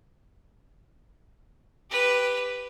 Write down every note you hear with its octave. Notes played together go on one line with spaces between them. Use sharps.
G4 B4